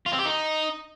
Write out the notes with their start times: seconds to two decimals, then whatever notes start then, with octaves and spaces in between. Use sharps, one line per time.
0.06 F4
0.12 C4
0.19 G4
0.25 D#4